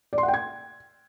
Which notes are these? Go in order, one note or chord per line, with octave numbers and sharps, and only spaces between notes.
D5
C6
F#5
G5
G#6